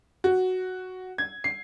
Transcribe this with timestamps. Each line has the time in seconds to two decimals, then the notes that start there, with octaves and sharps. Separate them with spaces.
0.24 F#4
1.18 G#6
1.44 C7